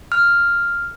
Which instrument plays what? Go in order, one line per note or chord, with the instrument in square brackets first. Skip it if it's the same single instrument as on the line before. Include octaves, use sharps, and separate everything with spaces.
[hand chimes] F6